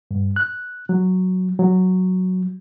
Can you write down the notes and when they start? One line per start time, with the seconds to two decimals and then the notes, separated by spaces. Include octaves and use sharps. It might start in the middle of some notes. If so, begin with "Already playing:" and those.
0.11 G2
0.36 F#6
0.89 F#3
1.59 F#3